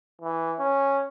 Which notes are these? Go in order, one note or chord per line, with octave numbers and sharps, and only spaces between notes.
E3
C#4